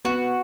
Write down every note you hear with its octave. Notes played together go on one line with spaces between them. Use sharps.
B3 F#4